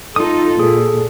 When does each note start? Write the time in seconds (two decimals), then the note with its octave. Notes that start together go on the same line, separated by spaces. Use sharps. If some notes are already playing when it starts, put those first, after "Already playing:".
0.16 D#4 F4 A4 D#6
0.59 A#2 G#4 A4